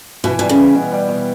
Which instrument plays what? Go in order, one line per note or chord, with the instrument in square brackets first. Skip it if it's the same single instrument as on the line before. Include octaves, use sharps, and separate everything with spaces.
[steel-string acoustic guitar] B2 [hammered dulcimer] E3
[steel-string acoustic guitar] B2 [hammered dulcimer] G3
[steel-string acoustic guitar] C#3
[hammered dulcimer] E3
B2
G3
B2